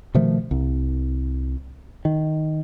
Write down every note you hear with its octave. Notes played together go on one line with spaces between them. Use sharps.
B2 D#3 F3 A3
C2
D#3